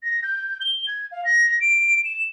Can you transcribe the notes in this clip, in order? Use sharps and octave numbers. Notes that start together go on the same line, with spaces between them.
A#6
G6
G7
G#6
F5
A#6
D7
E7